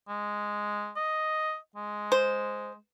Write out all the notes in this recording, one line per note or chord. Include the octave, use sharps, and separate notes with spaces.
G#3
D#5
G#3
C5